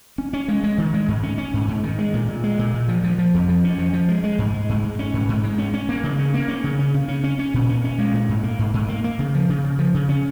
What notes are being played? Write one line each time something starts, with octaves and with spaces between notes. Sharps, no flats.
C#4
C#4
G#3
G#3
D#3
G#3
G#2
C#4
C#4
G#2
G#2
D#3
G#3
A#2
A#2
G#3
A#2
A#2
F3
F3
F3
F2
F3
C#4
F3
F3
G#3
G#3
G#2
G#3
G#2
G#3
C#4
G#2
G#2
G#3
C#4
C#4
A#3
C#3
C#4
A#3
C#4
C#3
C#4
C#3
C#4
C#4
C#4
A#2
C#4
C#4
G#3
A#2
G#2
A#3
G#2
G#2
A#3
A#3
C#3
F3
C#3
C#3
F3
C#3
C#4